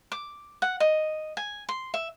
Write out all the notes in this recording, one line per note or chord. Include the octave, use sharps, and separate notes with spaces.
D6
F#5
D#5
G#5
C6
E5